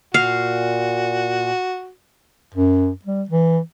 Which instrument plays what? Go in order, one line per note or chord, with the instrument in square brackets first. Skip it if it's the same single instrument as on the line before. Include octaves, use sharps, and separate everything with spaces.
[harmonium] A#2 [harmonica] F#4 [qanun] F5
[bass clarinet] F#2
G3
E3